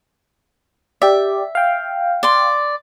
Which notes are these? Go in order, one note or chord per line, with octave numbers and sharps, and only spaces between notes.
G4 D5 E5
F5 G5
D5 C6